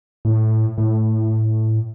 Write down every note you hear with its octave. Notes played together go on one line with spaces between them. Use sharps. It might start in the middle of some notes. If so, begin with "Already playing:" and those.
A2
A2